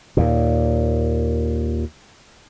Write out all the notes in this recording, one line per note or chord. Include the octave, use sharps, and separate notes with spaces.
D#2 A#2